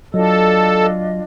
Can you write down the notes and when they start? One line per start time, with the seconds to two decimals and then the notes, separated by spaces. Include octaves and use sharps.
0.14 F#3 D4 F4 A4 D#5